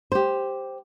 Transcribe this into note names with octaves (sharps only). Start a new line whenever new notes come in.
G4 C5